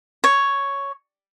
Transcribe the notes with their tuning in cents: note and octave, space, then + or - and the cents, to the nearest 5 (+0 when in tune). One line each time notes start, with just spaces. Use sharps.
C#5 +5